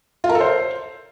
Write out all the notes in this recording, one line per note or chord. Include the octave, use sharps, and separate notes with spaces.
F4
A#4
A4
C5